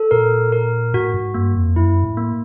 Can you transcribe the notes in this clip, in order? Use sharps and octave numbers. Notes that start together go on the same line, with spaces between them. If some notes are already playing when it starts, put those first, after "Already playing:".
Already playing: A4
A#2 A#4
A#4
A2 F#4
G#2
G2 A#3
F2
F#2 E4
A2
A#3